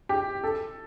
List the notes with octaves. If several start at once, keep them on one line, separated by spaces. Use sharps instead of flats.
G4
A4